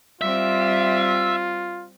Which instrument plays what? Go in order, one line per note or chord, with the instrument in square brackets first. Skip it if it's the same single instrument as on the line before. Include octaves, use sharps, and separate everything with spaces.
[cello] G3 C4 [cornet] F4 [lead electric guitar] E5